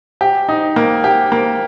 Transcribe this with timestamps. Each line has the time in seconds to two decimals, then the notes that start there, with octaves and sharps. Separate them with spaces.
0.21 G4
0.49 D#4
0.76 A#3
1.04 G4
1.32 A#3